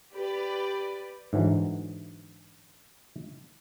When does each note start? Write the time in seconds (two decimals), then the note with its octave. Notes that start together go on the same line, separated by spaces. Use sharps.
0.13 G4 B4 D5
1.33 G#2 D3 E3 F#3